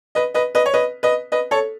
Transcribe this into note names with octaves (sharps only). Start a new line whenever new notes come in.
B4 D#5
B4 D#5
B4 D#5
C#5
B4 D#5
B4 D#5
B4 D#5
A4 C#5